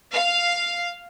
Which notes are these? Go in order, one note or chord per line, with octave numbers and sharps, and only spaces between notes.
F5